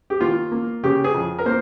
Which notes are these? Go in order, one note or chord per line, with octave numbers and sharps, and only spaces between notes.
G4
D#2 F4
A#3
C#3 G4
G#4
F2
A#4
A#3 C5